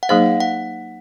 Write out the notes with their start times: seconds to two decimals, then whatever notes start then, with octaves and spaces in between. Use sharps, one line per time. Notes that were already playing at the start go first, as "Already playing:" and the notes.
0.03 F#5
0.09 F#3 A#3 D#4 G#4 C5 F5
0.41 F#5